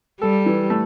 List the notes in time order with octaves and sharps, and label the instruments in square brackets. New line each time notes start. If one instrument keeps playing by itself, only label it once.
[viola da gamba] G3 [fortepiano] A4
[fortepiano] E3
A3